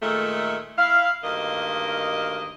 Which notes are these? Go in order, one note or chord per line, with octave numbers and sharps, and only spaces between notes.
A#2 D#3 G#3 A3
E4 F5
D2 G2 D#3 A#3 D#5